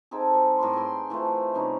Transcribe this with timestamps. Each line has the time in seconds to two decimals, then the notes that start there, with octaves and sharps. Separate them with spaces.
0.11 C4 D#4 G#4 A4
0.34 G3
0.59 A2 A#4 G5 C6
0.73 G#4 B4 G5 C6
1.10 E3 A3 F4 C5
1.54 C3 G3 C#4 D#4